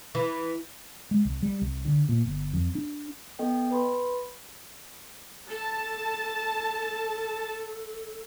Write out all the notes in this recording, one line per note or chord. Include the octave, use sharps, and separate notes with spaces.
E3
G#3
C2
G3
C2
D3
A#2
G1
F2
D4
B3 A4 D#5 G5
B4 B5 C6
A4 A5